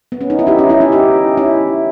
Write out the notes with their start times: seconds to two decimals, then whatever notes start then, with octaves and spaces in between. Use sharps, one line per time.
0.12 B3
0.21 C#4
0.30 D#4
0.39 E4
0.47 D#4 G4
0.59 C#4 E4
0.69 C#4 E4
0.81 D#4 G4
0.92 D#4 G4
1.37 C#4 E4